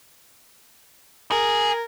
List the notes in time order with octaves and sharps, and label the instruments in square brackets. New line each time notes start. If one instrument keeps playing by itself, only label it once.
[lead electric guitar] G#4 [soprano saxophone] A#4